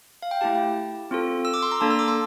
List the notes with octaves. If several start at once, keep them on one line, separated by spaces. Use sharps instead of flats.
F5
G5
A3 E4 G4 A5
C4 F4 A4
E6
D6
C6
A#5
A#3 D4 A4 A5
E6
D6
C6